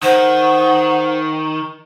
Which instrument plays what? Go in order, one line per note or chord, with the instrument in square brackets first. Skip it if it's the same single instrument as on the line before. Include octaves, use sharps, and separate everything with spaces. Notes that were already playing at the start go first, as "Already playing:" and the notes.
[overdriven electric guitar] D#3 [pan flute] C5 [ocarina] F#5